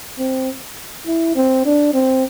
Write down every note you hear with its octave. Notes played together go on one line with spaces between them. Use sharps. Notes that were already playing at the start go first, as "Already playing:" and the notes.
C4
E4
C4
D4
C4